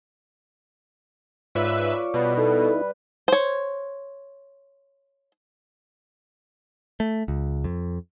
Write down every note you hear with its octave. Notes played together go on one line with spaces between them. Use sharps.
G#2 F4 B4 C#5 D5 E5
B2 G3 B4
D#4 E4 A4
C5 C#5
A3
C#2
F2